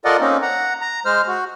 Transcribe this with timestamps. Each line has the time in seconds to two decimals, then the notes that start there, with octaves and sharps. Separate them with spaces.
0.05 F4 A4 A#4 D5 D#5 F#5
0.20 A#3 C4 C#4 D#4
0.42 F#5 A#5
0.82 A#5
1.06 G#3 C5 F6
1.28 F#4